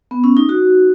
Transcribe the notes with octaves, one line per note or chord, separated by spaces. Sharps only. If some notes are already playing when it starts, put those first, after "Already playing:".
B3
C#4
D#4
F#4